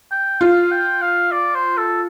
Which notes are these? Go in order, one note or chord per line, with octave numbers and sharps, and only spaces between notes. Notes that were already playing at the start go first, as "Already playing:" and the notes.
G5
F4 F5
G5
F5
D5
C5
A4